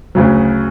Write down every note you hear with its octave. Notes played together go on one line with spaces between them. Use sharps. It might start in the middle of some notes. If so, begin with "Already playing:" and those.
D2 C#3 F#3